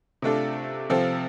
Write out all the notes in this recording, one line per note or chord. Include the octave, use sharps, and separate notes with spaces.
C3 A3 D4 F4 A4
C3 F3 C4 F4 A4